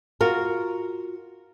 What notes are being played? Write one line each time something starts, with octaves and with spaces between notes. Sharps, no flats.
F4 F#4 A#4